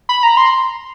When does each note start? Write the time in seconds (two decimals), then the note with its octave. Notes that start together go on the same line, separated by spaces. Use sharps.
0.09 B5
0.23 A#5
0.37 C6